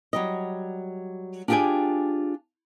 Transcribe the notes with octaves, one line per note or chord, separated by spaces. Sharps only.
F#3 G3 D#5
D4 F4 G4 G#4 G5 G#5